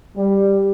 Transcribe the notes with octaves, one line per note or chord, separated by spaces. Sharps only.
G3